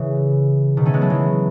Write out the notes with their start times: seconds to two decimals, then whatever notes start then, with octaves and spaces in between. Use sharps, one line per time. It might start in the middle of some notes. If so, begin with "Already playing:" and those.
Already playing: C#3 E3
0.77 B2 D#3
0.85 A3 C#4
0.94 G#3 B3
1.01 F#3 A3
1.10 E3 G#3